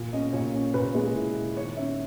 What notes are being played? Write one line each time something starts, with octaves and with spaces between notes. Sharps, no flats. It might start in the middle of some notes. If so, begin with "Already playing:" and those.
Already playing: A#2
C#4 D#5
A#2 C#5
C#4
A#2 B4
G#3
A#2 E4
A#2
D#3 C#5
C#4 E5